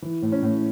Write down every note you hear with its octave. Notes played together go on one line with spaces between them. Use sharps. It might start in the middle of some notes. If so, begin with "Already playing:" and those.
E3
A2
C#4
A2